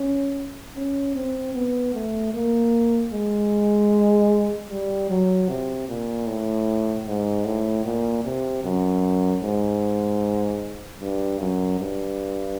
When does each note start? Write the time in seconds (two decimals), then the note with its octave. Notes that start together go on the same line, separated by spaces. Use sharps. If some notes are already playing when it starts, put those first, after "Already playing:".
Already playing: C#4
0.76 C#4
1.15 C4
1.55 B3
1.94 A3
2.34 A#3
3.13 G#3
4.70 G3
5.10 F#3
5.49 C3
5.89 A#2
6.27 A2
7.07 G#2
7.45 A2
7.85 A#2
8.24 C3
8.64 F#2
9.42 G#2
11.00 G2
11.40 F#2
11.79 G2